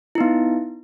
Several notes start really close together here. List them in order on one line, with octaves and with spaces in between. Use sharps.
E4 D#4 B3